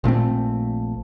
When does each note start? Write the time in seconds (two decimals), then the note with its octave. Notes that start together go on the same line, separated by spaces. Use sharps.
0.04 A#1 A#2 A3 C4